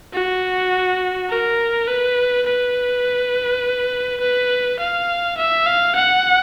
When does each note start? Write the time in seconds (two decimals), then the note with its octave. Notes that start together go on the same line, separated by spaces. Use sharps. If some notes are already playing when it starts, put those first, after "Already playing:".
0.13 F#4
1.29 A#4
1.88 B4
2.46 B4
4.20 B4
4.79 F5
5.37 E5
5.66 F5
5.95 F#5